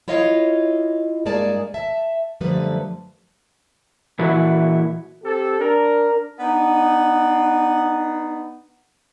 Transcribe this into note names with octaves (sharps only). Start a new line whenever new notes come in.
E4 F4 C#5 D#5 F5
G2 G#3 A#3 G#4 D5 A5
E5 A5
F#2 D3 F3 G3 A3 B4
A#2 E3 E4 F#4
C4 G4 A4
D4 A#4
B3 D4 D#4